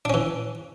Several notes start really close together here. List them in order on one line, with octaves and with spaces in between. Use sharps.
D4 C#4 E3